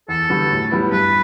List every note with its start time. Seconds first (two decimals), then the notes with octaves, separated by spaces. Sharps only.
0.08 E2 A4
0.30 D3 G3 B3 F#4
0.50 A2
0.71 G3 B3 E4
0.91 G2 B4